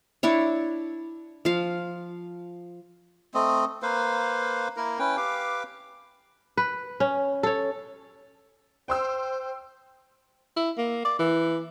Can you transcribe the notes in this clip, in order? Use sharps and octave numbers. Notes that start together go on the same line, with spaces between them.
D4 E4 C#5
F3 F5
A3 C4 D#5
A#3 B4 C5 F5
A#3 E4 A#4
C#4 E4 B4 G5
G4 B4 F5 D6
B4
C#4
A4 C#5
C5 G5 C6 E6
E4
A#3
D5
E3